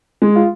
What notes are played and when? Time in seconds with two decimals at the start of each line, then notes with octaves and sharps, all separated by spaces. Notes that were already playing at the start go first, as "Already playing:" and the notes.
0.22 G#3
0.35 F4